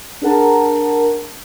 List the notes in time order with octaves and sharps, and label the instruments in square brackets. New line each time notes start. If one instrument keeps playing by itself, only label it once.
[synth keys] D4 G#4 A#4 F#5 A5 A#5